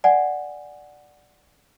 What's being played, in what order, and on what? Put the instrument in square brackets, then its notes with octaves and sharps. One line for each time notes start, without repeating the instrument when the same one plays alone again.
[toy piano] D5 F#5 G#5